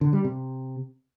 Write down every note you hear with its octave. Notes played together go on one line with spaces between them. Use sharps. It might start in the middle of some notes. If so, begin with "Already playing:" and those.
D3
G3
C3